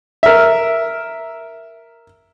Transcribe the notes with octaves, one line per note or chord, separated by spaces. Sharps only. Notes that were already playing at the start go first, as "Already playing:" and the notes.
A#4 E5